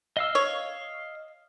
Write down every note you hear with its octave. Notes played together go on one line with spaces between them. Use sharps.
D#5 F5 E6
C#5